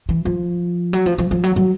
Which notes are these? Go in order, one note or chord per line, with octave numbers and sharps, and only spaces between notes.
E3
F3
F#3
F3
F3
F3
F#3
F#3